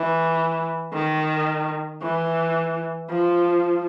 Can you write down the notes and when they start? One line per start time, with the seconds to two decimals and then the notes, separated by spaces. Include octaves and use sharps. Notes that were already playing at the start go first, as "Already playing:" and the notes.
Already playing: E3
0.94 D#3
2.02 E3
3.10 F3